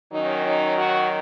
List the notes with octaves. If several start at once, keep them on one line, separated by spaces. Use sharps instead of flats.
D#3 F#3 C#4 D#4
D#4
F#4